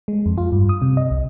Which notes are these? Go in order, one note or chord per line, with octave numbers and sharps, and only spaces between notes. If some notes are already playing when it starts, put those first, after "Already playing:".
G#3
F2
F4
G2
D#6
C3
D#5
C2